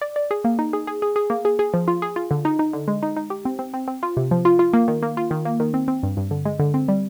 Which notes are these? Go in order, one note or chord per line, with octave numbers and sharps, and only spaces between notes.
D5
D5
G#4
A#3
D#4
G#4
G#4
G#4
G#4
A#3
G#4
G#4
F3
F4
G#4
F4
D3
D#4
D#4
D3
G#3
D#4
D#4
G4
C4
C4
C4
C4
F4
C3
F3
F4
F4
A#3
D#3
A#3
F4
D#3
A#3
D#3
C4
C4
G2
G2
D3
G#3
D3
C4
G3